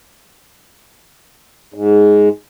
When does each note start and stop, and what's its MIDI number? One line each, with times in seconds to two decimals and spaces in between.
1.74 2.29 44